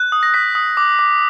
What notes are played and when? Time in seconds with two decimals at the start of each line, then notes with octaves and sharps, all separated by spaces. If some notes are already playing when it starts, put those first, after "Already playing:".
Already playing: F#6
0.12 D#6
0.23 A#6
0.34 F#6 B6
0.55 D#6
0.77 D6
0.99 D6